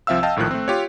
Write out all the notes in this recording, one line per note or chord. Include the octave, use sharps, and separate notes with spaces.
C2 F3 C4 E5 F5 E6
D#5 F5 G5 A5
A#1 A2 D#3 F3 F#6
A3 C4
F4 G4 C#5